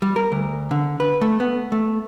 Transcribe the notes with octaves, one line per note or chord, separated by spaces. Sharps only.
G3
A#4
D2
D3
B4
A3
B3
A3